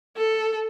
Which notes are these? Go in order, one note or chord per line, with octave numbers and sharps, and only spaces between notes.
A4